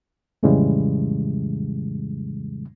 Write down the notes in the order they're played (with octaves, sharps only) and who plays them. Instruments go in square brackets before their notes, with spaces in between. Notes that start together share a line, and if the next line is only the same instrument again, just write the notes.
[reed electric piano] F2 A2 C#3 E3 G3 G#3